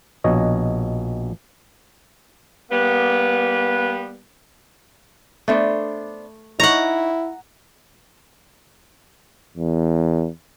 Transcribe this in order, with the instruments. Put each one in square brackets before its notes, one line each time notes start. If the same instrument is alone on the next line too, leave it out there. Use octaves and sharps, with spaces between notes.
[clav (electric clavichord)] A#1 B2 C#5 D#5
[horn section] G3 A#3 B3
[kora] A3 [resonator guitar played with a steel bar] B3 D4 C5
[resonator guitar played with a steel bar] D#4 C#5 [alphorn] E4 [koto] F#5 A#5
[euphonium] E2